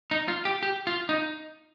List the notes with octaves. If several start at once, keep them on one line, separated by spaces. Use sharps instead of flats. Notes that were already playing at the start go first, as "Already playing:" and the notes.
D#4
F4
G4
G4
F4
D#4